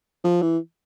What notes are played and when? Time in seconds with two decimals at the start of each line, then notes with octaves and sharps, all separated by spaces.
0.24 F3
0.42 E3